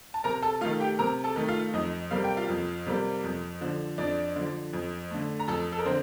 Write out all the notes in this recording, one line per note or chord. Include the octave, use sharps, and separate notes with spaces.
A5
C3 A#4 A#5
A4 A5
D#3 A3 F4 F5
G4 G5
C3 A#4 A#5
A4 A5
D#3 A3
F4 F5
F2 D#4 D#5
C3 G3 A#3 F5
G5
F4 F5
F2
C3 G3 A#3
F2
D3 F3
F2 D4 D5
D3 F3
F2
D3 A3
A#5
F2 A4 A5
A4
A#4
D3 C4 C5